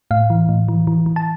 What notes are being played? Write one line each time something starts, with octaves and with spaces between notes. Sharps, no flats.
A2 F5
E3
A2
E3
E3
E3
A5